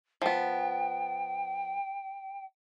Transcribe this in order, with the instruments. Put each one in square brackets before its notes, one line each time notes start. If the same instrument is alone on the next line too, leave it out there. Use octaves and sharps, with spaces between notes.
[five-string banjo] F3 B3 [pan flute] G5